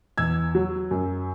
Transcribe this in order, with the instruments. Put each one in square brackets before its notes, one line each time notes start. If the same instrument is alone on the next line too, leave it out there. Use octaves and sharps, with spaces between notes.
[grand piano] E2 E6 G#6
F#3
F#2